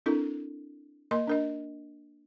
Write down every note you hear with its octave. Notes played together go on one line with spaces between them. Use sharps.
C4 D4 E4 A4 A#4
A#3 A#4 D#5 C6
D4 A#4 D#5